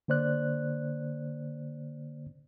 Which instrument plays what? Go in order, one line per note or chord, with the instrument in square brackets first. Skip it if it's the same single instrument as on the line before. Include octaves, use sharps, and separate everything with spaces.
[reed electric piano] D3 A#3 C5 D5 F#6